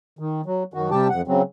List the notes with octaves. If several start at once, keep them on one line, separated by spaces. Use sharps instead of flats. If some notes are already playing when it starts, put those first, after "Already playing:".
D#3
F#3
F#2 D#3 F#4
C3 G3 G4 G5 A5
F2 F#5
C#3 F#3 C4